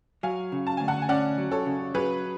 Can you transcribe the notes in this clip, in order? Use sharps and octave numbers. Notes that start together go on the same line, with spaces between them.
F#3 F5 G#5
C#3
A5
D2 G#5
F#5 A5
G#5
C#4 D5 F#5
F#3
A4 C#5
C#3
F#3 G#4 B4